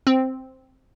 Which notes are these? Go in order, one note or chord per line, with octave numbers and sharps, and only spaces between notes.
C4